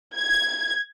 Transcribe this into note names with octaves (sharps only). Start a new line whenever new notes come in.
G#6